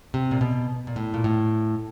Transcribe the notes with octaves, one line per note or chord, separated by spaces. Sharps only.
C3
A#2
B2
A#2
A2
A#2
A2